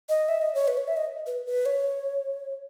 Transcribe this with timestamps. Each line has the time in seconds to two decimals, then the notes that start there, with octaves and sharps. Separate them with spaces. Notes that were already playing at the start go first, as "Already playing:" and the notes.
0.09 D#5
0.28 E5
0.41 D#5
0.54 C#5
0.68 B4
0.77 C#5
0.87 E5
0.97 D#5
1.26 B4
1.46 B4
1.65 C#5